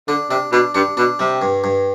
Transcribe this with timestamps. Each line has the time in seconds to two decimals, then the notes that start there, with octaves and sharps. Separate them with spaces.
0.08 D3 D4
0.30 C3 D4
0.52 B2 D4
0.75 G2 D4
0.97 B2 D4
1.19 C3 G3
1.42 G2
1.64 G2